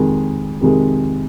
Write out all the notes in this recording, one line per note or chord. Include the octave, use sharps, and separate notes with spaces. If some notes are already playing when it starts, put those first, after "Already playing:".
Already playing: F2 C3 D#3 G#3
F2 C3 D#3 G#3